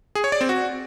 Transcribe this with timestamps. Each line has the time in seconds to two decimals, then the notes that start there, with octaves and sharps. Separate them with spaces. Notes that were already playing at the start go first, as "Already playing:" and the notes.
0.15 G#4
0.24 C#5
0.32 D5
0.41 C4
0.49 F#4